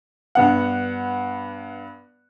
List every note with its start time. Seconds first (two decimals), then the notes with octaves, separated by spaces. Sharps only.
0.35 G2 B3 F#5